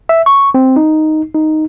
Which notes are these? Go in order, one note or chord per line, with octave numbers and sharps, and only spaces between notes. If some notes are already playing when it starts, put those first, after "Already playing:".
E5
C#6
C4
D#4
D#4